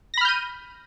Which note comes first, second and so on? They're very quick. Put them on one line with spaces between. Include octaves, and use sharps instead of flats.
A#6 B5 F6 G6 D#7